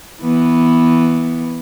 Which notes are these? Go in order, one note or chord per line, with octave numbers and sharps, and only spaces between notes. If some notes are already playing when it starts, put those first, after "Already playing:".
E3 B3